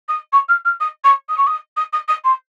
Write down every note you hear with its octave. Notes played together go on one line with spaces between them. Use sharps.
D#6
C#6
F6
F6
D#6
C#6
D#6
C#6
D#6
D#6
D#6
D#6
C6